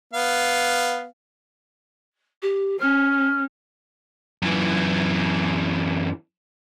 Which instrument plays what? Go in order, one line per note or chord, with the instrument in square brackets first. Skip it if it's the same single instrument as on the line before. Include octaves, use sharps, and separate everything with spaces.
[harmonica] B3 F5
[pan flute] G4
[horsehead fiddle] C#4 [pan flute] F6
[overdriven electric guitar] F#2 E3